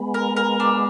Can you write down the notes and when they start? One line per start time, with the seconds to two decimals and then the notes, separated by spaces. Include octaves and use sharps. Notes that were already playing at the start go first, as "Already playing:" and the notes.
Already playing: G#3 B3
0.14 A#4
0.37 A#4
0.60 D4